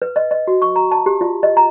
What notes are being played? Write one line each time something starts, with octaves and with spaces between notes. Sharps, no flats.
B4
D#5
D#5
F#4
C#6
A#5
A5
G4
F4
D#5
A#5